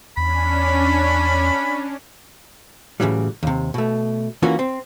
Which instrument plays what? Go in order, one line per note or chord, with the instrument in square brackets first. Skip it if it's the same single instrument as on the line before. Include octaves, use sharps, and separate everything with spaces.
[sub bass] E2 [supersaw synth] C#4 D4 [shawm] B5
[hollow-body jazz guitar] A2 C#3 E3 F#3 G3
D#2 C3
B2 A3
E3 A#3 C#4 F4 F#4
C4